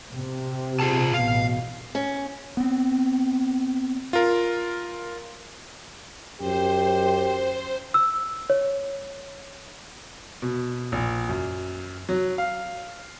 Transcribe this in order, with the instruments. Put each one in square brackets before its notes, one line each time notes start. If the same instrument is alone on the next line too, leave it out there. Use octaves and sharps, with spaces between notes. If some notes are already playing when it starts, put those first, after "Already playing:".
[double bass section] C3
[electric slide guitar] F4 G#4 A5
[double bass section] A1 B2 [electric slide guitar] F5
[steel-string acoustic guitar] C#4
[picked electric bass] B3 C4
[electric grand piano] F4 A#4
[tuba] F#2 [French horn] G4 [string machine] C5
[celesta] E6
C#5
[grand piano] B2
A#1
F#2
F#3
F5